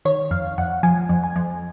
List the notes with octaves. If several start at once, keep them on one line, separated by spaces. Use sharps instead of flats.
D#3 C#5
F2 F5
F2 F#5
F3 G#5
F2
G#5
F2